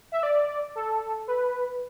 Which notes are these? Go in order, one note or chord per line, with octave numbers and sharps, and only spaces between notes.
E5
D5
A4
B4